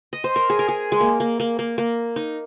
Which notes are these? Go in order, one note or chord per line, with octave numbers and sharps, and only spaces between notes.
D#5
C5
A#4
G#4
A#4
G#4
G#3
A#3
A#3
A#3
A#3
A#3
D#4